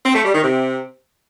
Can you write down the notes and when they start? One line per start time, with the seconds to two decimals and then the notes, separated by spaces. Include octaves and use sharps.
0.06 C4
0.15 A3
0.25 G3
0.34 D#3
0.44 C3